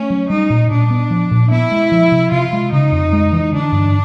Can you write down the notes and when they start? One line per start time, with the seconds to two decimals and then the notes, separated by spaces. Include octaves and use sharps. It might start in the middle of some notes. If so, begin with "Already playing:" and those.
Already playing: A3 C#4
0.10 F#3
0.30 G3 D#4
0.50 A#2
0.71 A#2 D4
0.90 B3
1.11 F3
1.31 A#2
1.51 B3 E4
1.72 G#3
1.92 F3
2.12 C3
2.31 C3 F4
2.53 G#3
2.72 C#3 D#4
2.92 F2
3.13 G#3
3.33 E3
3.53 D3 D4
3.72 G2